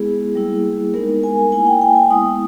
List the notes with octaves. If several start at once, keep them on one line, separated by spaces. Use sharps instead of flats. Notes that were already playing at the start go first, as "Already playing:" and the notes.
Already playing: G#3 B3 E4 G#4
G3 A#3 E4
G#3 B3 D#4 A#4
G#5
A#3 E4 G#5
G5
G5
G#5
G#3 B3 E4 D#6